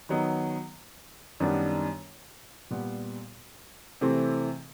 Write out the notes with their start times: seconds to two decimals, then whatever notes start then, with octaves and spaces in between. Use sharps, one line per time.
0.09 D#3 F#3 B3 D#4
1.40 F#2 D#3 G3 B3 D4
2.71 A#2 G3 B3
4.01 C3 E3 A3 C4